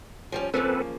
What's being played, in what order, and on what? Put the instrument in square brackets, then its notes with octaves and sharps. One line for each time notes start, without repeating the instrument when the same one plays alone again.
[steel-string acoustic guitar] F3 G3 C#4
[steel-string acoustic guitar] C#3 F3 A#3 [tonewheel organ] C4 A4 B4